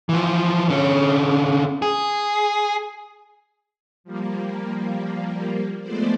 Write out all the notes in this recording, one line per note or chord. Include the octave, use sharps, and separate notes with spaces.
E3 F3
D3 C#4
G#4
F3 G3 A#3
F3 G#3 A3 B3 C5 D5